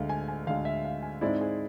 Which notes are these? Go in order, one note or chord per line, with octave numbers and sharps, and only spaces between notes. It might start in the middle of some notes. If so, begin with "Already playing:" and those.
Already playing: D2 D3 G#3 F5
G#5
G#5
D2 D3 G#3 F5
E5
F5
G#5
G#2 G#3 C4 E4 D5
G#4